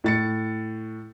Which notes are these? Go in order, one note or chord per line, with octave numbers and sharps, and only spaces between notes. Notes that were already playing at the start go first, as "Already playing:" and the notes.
A2 A6 C#7